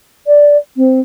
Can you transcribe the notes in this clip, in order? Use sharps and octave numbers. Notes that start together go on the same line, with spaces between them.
D5
C4